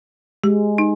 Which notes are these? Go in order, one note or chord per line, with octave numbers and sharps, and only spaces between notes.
G#3 G4
D#4